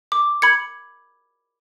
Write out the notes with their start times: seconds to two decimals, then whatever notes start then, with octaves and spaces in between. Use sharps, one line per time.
0.12 D6
0.42 B5 G#6 C#7